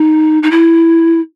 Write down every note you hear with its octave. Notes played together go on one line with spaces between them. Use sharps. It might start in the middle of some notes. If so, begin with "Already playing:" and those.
Already playing: D#4
D#4
E4